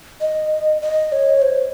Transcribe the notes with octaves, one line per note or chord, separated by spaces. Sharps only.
D#5
D#5
C#5
C5